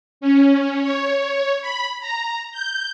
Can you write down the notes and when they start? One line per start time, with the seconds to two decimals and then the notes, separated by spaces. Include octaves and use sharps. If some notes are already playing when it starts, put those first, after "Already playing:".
0.21 C#4
0.82 C#5
1.62 B5
2.01 A#5
2.52 G6